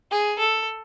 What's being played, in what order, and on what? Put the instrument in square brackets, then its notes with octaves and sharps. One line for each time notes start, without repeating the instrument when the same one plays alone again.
[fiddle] G#4
A4